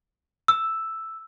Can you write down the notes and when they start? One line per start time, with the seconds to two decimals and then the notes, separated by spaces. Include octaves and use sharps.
0.48 E6